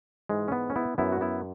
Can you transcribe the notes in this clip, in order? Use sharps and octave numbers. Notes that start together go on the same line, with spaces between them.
G#2 E3 G#3
C#4
B3
C#4
B3 E4
F#2 F#3 B3 E4
F#4
B3 E4